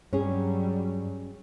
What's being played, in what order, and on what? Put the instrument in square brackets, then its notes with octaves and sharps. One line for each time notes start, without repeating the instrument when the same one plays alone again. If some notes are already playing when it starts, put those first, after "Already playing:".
[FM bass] G2 [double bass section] F#3 G3 [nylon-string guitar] C#4 G#4